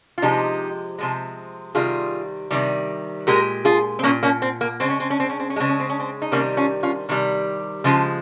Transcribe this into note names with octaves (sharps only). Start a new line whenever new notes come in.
F4
C3 F3 G#3 D#4 G4
C3 F3 G#3
C3 D#3 G3 F4 G#4
C3 D#3 G3
A#2 G#3 G4 A#4
F4 G#4
C4
A#2 G#3 A#3 C#4
A#3 C#4
C4
A#3
C#3 G#3 C4
C#4
C4
C#4
C4
C#4
C4
C#4
C#3 G#3 C4
C#4
C4
C#4
C4
D#4
C3 D#3 G3 A#3 C#4
C#4 F4
C#4 F4
C3 D#3 G3
C#3 F3 G#3